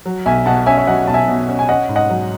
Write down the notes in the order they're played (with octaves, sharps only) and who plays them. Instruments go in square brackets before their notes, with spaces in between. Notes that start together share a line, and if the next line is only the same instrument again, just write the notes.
[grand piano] F#3
[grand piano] B1 [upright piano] E5 G#5
[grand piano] B2 [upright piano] F#5 A5
[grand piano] C#4 [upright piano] E5 G#5
[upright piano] E5
[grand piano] F#3 [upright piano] D#5 F#5
[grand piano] B1 [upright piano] A5
[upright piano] E5 G#5
[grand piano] B2
C#4
[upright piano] G#5
[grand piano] C#4 [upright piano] D#5 F#5
[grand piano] G#2
[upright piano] D#5 F#5
[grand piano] F#3